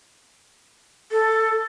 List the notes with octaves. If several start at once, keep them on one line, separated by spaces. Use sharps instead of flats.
A4